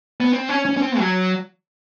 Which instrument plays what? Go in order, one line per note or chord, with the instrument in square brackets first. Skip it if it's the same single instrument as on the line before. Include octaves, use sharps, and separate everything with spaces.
[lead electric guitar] B3
C4
C#4
C#4
C#4
C4
F#3